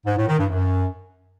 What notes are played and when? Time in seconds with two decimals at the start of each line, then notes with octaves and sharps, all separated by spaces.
0.06 G#2
0.17 A2
0.27 D#3
0.38 G2
0.49 F#2